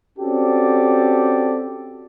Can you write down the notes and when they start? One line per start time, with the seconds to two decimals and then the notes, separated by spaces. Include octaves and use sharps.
0.18 C4 C#4 F#4 G4 A4 D5